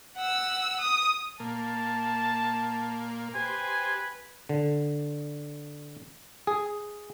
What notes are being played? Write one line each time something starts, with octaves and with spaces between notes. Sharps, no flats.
F#5 E6
D#6
A#2 A#3 A5
G4 B4 C5 G#5
D3
G#4